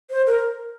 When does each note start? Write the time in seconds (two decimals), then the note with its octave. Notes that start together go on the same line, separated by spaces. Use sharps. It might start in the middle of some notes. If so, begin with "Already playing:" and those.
0.10 C5
0.27 A#4